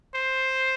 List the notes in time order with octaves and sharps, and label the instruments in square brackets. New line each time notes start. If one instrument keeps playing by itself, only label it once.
[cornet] C5